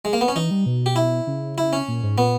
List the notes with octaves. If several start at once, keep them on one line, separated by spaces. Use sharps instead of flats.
G#3
A#3
B3
C#4
E3 D#4
G3
B2
G4
E4
C#3
E4
C#4
A#2
G#2
A#2 B3